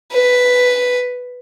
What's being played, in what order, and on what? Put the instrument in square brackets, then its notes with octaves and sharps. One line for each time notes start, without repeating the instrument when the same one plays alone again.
[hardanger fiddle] B4